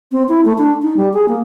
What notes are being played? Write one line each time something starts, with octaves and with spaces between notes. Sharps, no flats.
C4
E4
A3
D4
D#4
G3
G#4
A#3